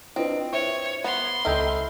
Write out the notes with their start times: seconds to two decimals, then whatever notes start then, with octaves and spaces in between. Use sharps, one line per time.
0.16 C4 D4 E4 F4 B4 D#5
0.53 C5 C#5 E5 C#6
1.04 B3 C6
1.45 C#2 C4 D#4 E4 A4 F6 G6